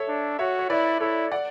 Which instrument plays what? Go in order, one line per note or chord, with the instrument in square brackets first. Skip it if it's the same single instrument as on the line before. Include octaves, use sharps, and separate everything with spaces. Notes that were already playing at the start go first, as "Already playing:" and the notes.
Already playing: [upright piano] A4 C#5 E5
[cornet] D4
[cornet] F#4 [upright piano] C#5 E5
[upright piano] C#5
[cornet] E4 [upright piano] B4 D5
[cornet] E4 [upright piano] A4 C#5
[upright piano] D5 F#5